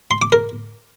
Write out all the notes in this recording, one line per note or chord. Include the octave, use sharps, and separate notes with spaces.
C6
D6
A#4